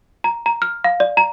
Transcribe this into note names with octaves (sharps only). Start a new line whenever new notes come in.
A#5
A#5
F6
F5
D5
A#5